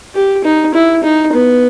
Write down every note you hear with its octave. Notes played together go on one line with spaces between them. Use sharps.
G4
D#4
E4
D#4
B3